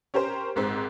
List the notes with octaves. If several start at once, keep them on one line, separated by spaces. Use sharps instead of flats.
C#4 G4 A#4 C5
G#1 G#2 C4